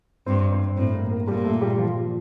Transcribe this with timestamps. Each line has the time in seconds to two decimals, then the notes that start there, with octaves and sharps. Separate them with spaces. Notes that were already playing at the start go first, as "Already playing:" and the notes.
0.26 G2 C4 C5
0.52 C4 C5
0.77 A2 C4 C5
0.95 A#3 A#4
1.11 A#3 A#4
1.28 A#2 G3 G4
1.45 A3 A4
1.61 G3 G4
1.78 F3 F4